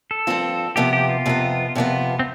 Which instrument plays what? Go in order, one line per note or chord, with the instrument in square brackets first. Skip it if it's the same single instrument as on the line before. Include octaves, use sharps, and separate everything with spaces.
[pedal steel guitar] A4
[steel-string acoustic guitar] G2 F3 C4 F4
[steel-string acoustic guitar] F2 C3 F3 B3 [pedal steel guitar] G4
[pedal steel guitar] G4
F4
[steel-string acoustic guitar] F2 C3 F3 B3
F2 C3 F3 B3
[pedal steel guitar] C4